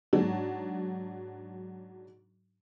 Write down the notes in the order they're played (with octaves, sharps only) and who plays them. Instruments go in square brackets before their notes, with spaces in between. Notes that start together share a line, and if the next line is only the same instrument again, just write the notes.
[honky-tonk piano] G#2 F#3 D4